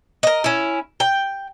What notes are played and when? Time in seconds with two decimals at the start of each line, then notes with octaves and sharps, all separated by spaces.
0.23 A#4 D#5
0.44 C#4 E4
1.00 G5